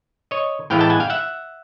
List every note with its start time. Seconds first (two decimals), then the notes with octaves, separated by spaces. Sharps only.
0.31 C#5 D#5
0.70 A2 E3 G#3 B3 E4 F5 G5
0.80 G5 A5
0.90 F#5 G#5
1.00 F5 G5
1.10 E5 F#5